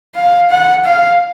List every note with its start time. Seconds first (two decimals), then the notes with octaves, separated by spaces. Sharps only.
0.16 F5
0.51 F#5
0.85 F5